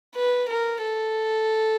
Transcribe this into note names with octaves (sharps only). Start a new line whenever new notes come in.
B4
A#4
A4